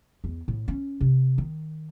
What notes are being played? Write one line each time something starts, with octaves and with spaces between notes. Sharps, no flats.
E2
A2
C#4
C3
D#3